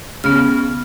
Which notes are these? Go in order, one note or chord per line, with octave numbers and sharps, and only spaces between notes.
C#3 B3 F6